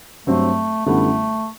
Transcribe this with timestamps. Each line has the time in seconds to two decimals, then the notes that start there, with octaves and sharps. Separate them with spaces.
0.27 G2 F#3 A3 C4
0.86 F#2 D3 G3 A3 B3 E4